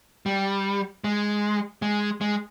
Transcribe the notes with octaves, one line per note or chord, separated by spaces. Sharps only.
G3
G#3
G#3
G#3